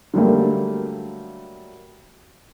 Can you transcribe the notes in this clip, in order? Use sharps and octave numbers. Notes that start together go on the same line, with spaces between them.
D3 F#3 G3 A3 A#3